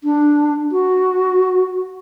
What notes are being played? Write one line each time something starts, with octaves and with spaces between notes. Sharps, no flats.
D4
F#4